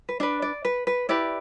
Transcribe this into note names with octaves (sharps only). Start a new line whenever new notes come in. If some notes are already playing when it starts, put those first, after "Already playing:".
B4
D4 B4 D5
D5
B4
B4
E4 G4 B4 D5